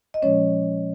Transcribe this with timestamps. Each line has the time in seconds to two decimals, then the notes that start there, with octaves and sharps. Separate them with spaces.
0.14 D#5
0.22 A#2 F3 G#3 C#4 C#5